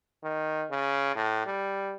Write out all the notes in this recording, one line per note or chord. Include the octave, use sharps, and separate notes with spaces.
D#3
C#3
A2
G3